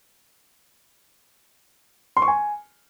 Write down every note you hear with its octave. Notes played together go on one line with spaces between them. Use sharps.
C6
C#6
G#5